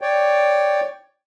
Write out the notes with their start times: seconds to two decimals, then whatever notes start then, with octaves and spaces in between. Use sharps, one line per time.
0.01 C#5 D5 G5